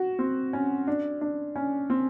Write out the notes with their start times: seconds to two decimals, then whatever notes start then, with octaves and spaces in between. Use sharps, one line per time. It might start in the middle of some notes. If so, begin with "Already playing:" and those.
Already playing: F#4
0.19 C4
0.53 C#4
0.87 D4
1.21 D4
1.56 C#4
1.90 C4